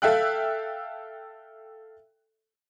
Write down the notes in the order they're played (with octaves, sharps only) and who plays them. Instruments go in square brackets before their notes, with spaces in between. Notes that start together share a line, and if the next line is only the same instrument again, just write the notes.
[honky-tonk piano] A4 E5 F5 G5 F#6